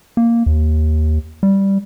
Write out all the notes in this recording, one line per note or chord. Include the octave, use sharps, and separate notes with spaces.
A#3
D#2
G3